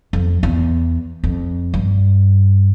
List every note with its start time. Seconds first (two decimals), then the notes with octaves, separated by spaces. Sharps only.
0.13 F2
0.43 E2
1.24 F2
1.74 G2